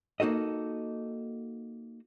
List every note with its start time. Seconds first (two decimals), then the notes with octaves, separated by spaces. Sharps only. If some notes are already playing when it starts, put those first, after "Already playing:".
0.20 A#3 D#4 F#4 A4 D#5